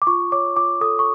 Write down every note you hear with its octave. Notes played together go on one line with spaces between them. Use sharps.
D6
F4 C#6
C#5 D6
F4 D6
A4 D#6
C#6